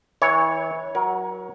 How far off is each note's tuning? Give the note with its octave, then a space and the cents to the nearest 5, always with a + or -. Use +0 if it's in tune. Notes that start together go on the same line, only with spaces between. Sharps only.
E3 -25 C#5 +0
F#3 +0 A#4 +30